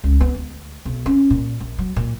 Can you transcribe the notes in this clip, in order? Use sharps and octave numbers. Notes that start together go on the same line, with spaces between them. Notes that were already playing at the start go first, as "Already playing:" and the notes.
C#2
B3
D2
B1
C#4
A#2
A#1
F#3
A#2